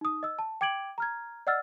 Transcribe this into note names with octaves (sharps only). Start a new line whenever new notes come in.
D#4 D#6
D#5 E6
A5
G5 D6 G#6 D7 F#7
A#5 F6 G#6
D5 D#5 F#5 E6 F6 A6